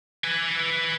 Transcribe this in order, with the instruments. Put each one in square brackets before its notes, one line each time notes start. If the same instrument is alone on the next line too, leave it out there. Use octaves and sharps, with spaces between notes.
[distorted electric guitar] B4 G#5